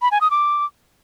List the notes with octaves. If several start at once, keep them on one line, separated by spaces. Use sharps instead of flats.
B5
G#5
D#6
D6